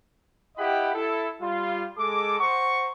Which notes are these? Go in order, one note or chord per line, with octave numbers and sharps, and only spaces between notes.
E4 G4 D#5 F#5 G5 B5
E4 A4
G3 F4
G#3 A4 D6
C5 F#5 A#5 C#6